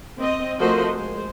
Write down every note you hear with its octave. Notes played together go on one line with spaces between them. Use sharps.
C4 D#5
F3 A3 F#4 A#4 C5 D#5
G#3 C5